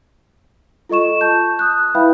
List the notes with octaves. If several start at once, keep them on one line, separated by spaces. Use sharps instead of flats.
F4 A4 D#5 C#6 E7
A5 G6
D#6 F#6
E4 B4 E5 F5 G5 B5